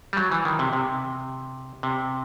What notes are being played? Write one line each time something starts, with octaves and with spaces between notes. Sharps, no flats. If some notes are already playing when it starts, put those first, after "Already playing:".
G3
F#3
E3
D#3
C3
C3
C3